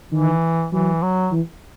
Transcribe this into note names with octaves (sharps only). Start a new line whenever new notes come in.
D#3 E3
E3 F#3
F#3
E3